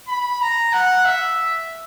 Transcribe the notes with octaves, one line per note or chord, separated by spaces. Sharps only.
B5
A#5
F#5
E5